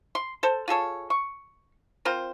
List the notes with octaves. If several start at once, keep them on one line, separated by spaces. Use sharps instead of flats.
C6
A4 C5
F4 G#4 A4 C#5
C#6
C4 F4 A#4 C5